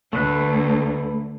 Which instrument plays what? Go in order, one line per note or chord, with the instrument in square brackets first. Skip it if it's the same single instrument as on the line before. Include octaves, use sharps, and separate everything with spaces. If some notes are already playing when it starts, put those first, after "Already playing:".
[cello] D2 [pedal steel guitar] A3 B4 F#6